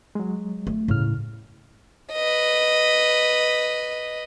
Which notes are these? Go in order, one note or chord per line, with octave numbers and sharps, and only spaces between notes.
F#3 G#3
A3
D#2 A2 C#3 F6
B4 D#5